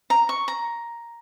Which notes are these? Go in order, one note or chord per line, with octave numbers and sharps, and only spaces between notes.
A#5
C#6
A#5